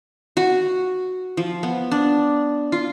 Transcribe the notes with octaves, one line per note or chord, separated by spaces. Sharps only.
F#4
F3
B3
D4
F4